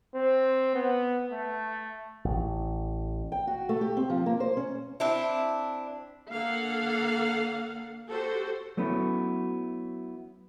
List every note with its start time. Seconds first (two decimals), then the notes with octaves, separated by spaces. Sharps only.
0.15 C4
0.75 B3
1.32 A3
2.25 A1
3.32 G5
3.47 F#4
3.69 A3
3.81 G4
3.97 C4
4.10 F3
4.26 A#3
4.40 C5
4.57 C#4
5.00 C4 D4 E4
6.29 D3 A#3 A4 F5 F#5
8.08 F#4 G4 A4 C5
8.77 F#3 A3 B3 C#4 E4